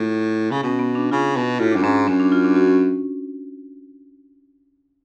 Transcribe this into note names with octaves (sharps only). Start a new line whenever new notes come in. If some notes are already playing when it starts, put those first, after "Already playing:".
Already playing: A2 F4
C#3
B2 C#4
B3
D4
C#3 F4
B2 F#4
A2 F4
F#2 D4
G#2 C#4
F#2 C#4
D4
F4
D4
F#4
C#4